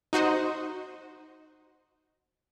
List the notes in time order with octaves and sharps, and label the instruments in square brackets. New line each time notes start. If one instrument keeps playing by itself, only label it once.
[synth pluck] D#4 F#4 C5 D#5